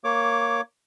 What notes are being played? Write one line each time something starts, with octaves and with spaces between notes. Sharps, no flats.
A#3 C#5 D6